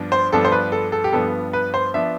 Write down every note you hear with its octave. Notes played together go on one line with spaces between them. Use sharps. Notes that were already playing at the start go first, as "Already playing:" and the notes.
Already playing: G2 F3 B3 D4
C5
G2 F3 B3 D4 A4
C5
B4
A4
A4
G4
G2 F3 B3 D4 A4
B4
C5
F3 B3 D4 E5